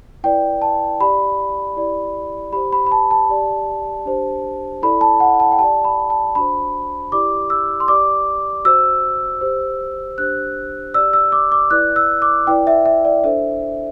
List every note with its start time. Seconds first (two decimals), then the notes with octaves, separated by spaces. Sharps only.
0.24 E4 B4 D5 G5
0.62 A5
1.00 G4 D5 B5
1.77 E4 G4 D5
2.53 G4 C5 B5
2.73 B5
2.86 B5
2.92 A5
3.11 A5
3.29 G4 D5
4.05 D4 G4 C5
4.82 E4 A4 D5 B5
5.01 A5
5.20 F#5
5.40 A5
5.52 G5
5.59 G4 D5 A5
5.84 B5
6.10 A5
6.35 D4 F#4 C5 B5
7.12 E4 G4 D5 D6
7.50 E6
7.80 C6
7.88 G4 D5 D6
8.65 F#4 C5 E6
9.41 G4 C5
10.18 D4 G4 C5 F#6
10.94 G4 D5 E6
11.13 E6
11.32 D6
11.52 D6
11.71 E4 B4 D5 F#6
11.96 E6
12.22 D6
12.47 E4 B4 D5 G5
12.67 E5
12.86 E5
13.05 D5
13.24 D4 A4 C5 E5